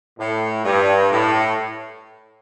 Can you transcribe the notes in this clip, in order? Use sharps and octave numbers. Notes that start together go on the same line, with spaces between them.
A2
G2
A2